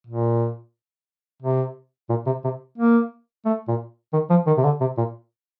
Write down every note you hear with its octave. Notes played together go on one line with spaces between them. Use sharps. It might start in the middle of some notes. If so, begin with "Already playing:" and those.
A#2
C3
A#2
C3
C3
A#3
A3
A#2
D#3
F3
D#3
C3
D3
C3
A#2